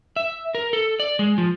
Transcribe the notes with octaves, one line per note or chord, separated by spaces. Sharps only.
E5
A#4
A4
D5
G#3
F3